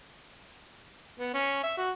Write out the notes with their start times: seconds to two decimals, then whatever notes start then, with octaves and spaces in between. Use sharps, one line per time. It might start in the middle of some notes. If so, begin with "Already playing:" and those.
1.19 B3
1.34 C#4
1.63 E5
1.77 F#4